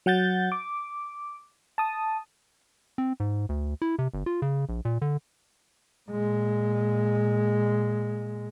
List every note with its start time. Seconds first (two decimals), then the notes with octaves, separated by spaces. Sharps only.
0.06 F#3 F#5 G6 A6
0.52 D6
1.78 A5 D#6
2.98 C4
3.20 G#2
3.49 D2
3.82 E4
3.99 C3
4.14 G1
4.26 F4
4.42 C#3
4.69 A#1
4.85 A#2
5.02 D3
6.10 A#2 G#3